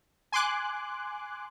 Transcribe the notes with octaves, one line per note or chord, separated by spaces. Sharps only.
G#5 C6 D6 F#6